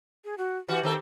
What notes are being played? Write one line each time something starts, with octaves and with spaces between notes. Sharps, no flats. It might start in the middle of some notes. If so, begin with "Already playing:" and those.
G#4
F#4
E3 F#4 G4
D#3 C4 A4